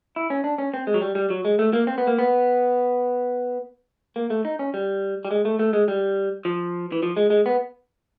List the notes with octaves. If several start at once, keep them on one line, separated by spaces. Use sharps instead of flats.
E4
C#4
D4
C#4
C4
G#3
F#3
G3
G3
F#3
G#3
A3
A#3
C4
B3
A#3
B3
A#3
A3
D#4
C#4
G3
G3
G#3
A3
A3
G#3
G3
F3
E3
F3
G#3
G#3
B3